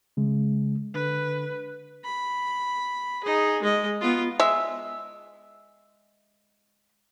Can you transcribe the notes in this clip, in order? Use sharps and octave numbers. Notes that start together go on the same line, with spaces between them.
C#3 G#3
D3 B4
B5
D#4 G#4
G#3 D#5
B3 F4
G#3 E5